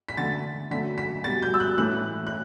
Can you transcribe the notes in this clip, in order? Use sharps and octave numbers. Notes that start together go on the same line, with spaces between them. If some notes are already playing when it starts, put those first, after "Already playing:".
B6
D3 A3 A6
D3 F#3 A3 B6
B6
B2 G3 A6
G6
E6
F#6
A2 E3 A3 F#6
F#6